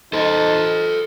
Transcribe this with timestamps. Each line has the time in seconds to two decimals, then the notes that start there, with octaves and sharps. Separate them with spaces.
0.13 D#4 A4 C5